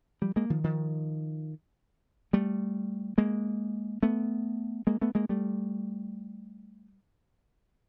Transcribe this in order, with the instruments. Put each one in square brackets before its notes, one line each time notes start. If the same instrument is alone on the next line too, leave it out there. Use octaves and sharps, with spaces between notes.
[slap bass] F3 G3
G#3 A#3
D#3 F3
D#3 F3
G3 A3
G#3 A#3
A3 B3
G#3 A#3
A3 B3
G#3 A#3
G3 A3